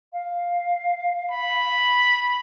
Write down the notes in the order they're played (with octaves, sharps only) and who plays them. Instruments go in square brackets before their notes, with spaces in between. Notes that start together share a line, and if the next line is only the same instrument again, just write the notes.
[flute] F5
[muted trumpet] B5